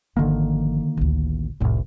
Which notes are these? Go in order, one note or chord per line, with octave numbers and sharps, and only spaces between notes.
G#1 D3 D#3 F3 A#3
A1 D2
F1 C2 F2 A2